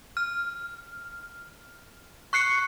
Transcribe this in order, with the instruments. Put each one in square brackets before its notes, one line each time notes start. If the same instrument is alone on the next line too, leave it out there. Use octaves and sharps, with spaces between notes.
[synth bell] F6
C#6 F#6 C7 C#7